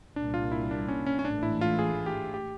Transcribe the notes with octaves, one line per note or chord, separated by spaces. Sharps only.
C2 A#2 G3 A#3 D4
F4
E4
D4
C#4
C#4
C#4
A1 G#2 E3 A3 D4
E4
F4
G#4
G4
G4